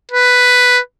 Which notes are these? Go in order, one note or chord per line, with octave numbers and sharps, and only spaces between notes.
B4